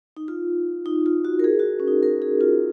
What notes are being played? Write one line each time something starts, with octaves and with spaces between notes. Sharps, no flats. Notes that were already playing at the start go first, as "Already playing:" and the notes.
D#4
F4
D#4
F4
F#4
A#4
G#4
F#4
C#4
D#4
A#4
G#4
F4